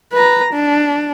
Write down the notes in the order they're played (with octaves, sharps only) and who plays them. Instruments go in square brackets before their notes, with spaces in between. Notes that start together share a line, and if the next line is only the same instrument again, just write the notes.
[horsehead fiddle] B4 A#5
D4